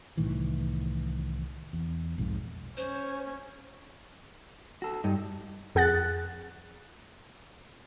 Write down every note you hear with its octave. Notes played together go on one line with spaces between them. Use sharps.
C2 A2 D#3 E3
E2
B1 F2 G#2
C#4 C5
F#4 A4
G2 D#4
F2 G#4 F#5 F#6 A6